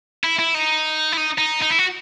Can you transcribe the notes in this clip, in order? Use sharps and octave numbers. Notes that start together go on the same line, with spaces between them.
E4
E4
D#4
E4
D#4
D#4
D#4
E4
F#4